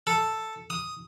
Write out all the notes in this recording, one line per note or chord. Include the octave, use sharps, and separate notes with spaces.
A4
D#6